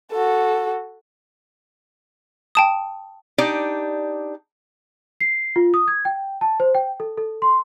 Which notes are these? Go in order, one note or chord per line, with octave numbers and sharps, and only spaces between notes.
F#4 A4
G5 A5 D#6
D4 D#4 G4 D5
C7
F4
D#6
G#6
G5
A5
C5
G5
A4
A4
C6